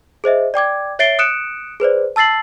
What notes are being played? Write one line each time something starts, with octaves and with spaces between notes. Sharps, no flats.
G#4 C5 D#5 E5
D5 G5 D6 G#6
C#5 E5 A6 C7 D7 G7
D#6 F#6 C#7 D7 E7
G#4 B4 C5 D5
A5 E6 A6 C7 F#7